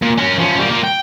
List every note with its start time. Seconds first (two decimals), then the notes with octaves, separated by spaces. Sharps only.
0.02 A#2
0.17 C#4 A#4
0.38 F3 C#4
0.59 G3 A#3
0.70 A#3 F4
0.84 G5